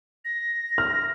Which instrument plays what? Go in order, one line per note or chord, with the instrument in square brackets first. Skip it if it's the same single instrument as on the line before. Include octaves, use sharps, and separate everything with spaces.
[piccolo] A#6
[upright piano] F6